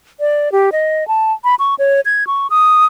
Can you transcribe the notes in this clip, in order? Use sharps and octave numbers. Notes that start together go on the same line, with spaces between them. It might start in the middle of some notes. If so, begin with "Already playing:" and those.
D5
G4
D#5
A5
B5
C#6
C#5
G#6
C#6
D#6